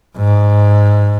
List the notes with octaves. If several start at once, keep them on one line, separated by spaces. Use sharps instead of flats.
G#2